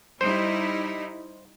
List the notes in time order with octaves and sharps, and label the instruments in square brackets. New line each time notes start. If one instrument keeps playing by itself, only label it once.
[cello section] G3 D#4 E4 [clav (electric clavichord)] C5